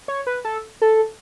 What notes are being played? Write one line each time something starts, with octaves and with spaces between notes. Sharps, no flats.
C#5
B4
A4
A4